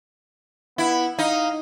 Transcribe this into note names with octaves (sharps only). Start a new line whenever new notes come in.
B3 E4
D#4 F5